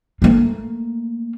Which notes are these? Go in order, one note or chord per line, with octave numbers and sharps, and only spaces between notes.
A3 A#3